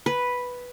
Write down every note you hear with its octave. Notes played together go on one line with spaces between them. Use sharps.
B4